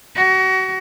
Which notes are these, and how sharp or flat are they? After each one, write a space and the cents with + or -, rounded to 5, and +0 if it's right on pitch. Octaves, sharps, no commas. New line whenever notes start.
F#4 +30